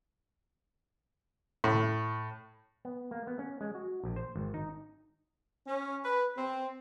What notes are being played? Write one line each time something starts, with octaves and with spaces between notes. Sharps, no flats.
A2
B3
A#3
B3
C#4
G#3
F#4
A#1
C5
G#1
D#4
C#4
B4
C4